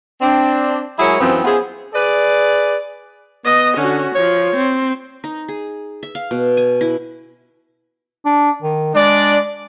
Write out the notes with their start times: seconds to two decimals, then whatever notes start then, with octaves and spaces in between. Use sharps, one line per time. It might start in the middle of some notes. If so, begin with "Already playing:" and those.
0.21 C4 D4
0.99 F#3 G#3 E4 G#4 A#4 C#5
1.20 F#2 E3 F3 B3 C4
1.44 B3 C#4 E4 F4 G#4 C5
1.93 G#4 B4 D5
3.45 B3 D#5
3.77 D3 C#4 F#4
4.15 F3 C#5
4.56 C4
5.24 D#4
5.48 G#4
6.03 E5
6.15 F5
6.31 B2
6.57 G#5
6.81 E4
8.25 D4
8.62 D#3
8.95 G#3 D4 D5